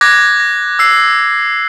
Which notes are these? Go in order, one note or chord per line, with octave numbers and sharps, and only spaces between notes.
D6 F#6 G#6 A#6
A#6
E6 C7